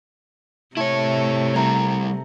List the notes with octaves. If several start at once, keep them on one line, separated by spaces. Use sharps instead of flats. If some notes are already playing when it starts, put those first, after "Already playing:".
C3 A3 E4 C#5
G3 E4 A#5